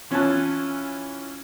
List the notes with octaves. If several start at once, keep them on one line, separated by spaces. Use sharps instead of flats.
E3 C#4 F4 G#5 A5 F#6